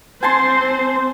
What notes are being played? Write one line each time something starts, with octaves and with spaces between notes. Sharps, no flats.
C4 C5 G#5 A5 C6